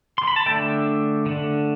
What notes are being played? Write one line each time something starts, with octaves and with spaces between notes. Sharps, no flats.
C6
B5
A5
D3 A3 D4 E5 G5
D3 A3 D4